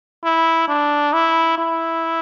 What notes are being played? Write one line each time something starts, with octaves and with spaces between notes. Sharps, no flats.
E4
D4
E4
E4